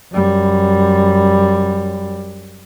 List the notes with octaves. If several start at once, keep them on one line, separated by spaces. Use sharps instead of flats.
F#2 G3